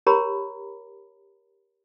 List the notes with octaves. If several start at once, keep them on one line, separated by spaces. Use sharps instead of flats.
G4 A#4 C#5 A#5 B5